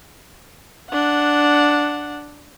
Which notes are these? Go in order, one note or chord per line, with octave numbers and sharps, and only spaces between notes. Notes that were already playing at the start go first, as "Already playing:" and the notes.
D4 F#5